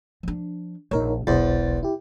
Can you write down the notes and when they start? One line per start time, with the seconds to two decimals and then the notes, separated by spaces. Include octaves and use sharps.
0.23 F3 D4
0.91 A#1 D#2 D#4 A#4 C#5
1.27 E1 B1 E2 C5 A6
1.83 E4 G4